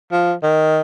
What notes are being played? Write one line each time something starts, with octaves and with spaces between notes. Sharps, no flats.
F3
D#3